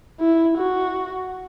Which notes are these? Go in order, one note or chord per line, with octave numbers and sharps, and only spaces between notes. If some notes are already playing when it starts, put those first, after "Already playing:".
E4
F#4